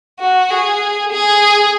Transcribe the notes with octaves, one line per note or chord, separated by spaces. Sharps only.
F#4
G#4
G#4